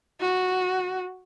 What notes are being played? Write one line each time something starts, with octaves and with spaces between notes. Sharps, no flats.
F#4